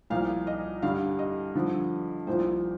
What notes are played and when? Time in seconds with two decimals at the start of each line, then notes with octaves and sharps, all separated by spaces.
0.10 C2 A#2 F3 F5
0.47 D#5
0.82 G2 D3 G3 F5
1.19 D#5
1.55 G2 D3 F3
2.27 C2 A#2 F3 C5